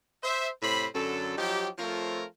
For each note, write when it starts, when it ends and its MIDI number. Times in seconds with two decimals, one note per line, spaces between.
0.23 0.48 72
0.23 0.48 76
0.62 0.86 45
0.62 0.86 48
0.62 0.86 72
0.62 0.86 83
0.95 1.33 42
0.95 1.33 50
0.95 1.33 54
0.95 1.33 69
1.37 1.68 53
1.37 1.68 54
1.37 1.68 63
1.37 1.68 67
1.78 2.24 53
1.78 2.24 57
1.78 2.24 60
1.78 2.24 65
1.78 2.24 70
1.78 2.24 73